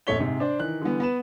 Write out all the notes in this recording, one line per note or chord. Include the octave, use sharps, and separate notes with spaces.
A#1 F2 A3 C#5 B6 G7
G#2 C3
D4 C5 D5
D#3 E3 F#6
D3 E3 G3 B3
B3 B4 E7